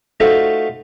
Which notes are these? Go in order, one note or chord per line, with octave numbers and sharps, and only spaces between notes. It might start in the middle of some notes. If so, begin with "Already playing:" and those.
A3 D#4 F4 F#4 A4 C5